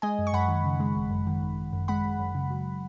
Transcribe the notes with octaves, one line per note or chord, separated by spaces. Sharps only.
G#3 D#5 G#5
F#2
C#6
F#2 F#5 B5
D#3
C#3
G#3
G#1
F#2
D#3
G#1
G#1
F#2
G#3 F#5 B5
F#2
F#2
C#3
F#3